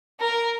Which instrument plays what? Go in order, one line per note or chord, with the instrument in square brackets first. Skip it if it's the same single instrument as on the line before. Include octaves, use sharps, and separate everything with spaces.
[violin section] A#4